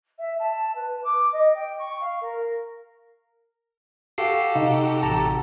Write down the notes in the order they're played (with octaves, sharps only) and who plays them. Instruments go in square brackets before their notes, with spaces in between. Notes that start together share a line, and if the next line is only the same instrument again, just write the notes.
[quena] E5
A5
B4
D6
D#5
G5
C#6
F5
A#4
[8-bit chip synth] F#4 G4 A4 [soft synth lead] F5 [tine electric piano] C7
[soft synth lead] C3 [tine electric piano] D#4
[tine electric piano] A1 A5 A#5